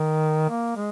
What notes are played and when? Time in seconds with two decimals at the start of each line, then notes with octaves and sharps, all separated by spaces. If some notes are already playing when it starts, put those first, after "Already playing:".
Already playing: D#3
0.50 A#3
0.76 G#3